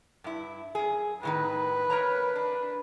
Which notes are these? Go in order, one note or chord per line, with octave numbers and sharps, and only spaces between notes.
G2 E4
F#2 G#4
A2 D#3 D#4 B4
A#4 C#5 A#5
D4